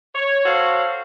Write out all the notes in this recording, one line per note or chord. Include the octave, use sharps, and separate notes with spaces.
C#5
F#4 A4 C5 C#5 F5